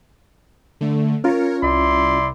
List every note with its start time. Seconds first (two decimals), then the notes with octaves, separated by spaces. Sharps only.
0.81 D3 A3
1.24 C#4 F4 A#4 C#5
1.63 C2 E4 D5 C6